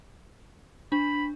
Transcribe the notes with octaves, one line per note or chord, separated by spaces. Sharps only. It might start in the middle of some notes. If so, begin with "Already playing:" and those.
D4 B5